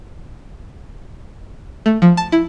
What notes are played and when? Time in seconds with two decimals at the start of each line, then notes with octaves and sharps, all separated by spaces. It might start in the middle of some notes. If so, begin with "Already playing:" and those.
1.86 A3
2.02 F3
2.17 A5
2.32 E4